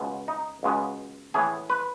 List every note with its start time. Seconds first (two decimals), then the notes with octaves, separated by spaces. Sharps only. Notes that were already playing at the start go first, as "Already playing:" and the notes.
Already playing: C#2 B2 G#3 B3
0.28 D#4
0.63 C#2 B2 G#3 B3
1.34 A2 E3 B3 G#4
1.70 B4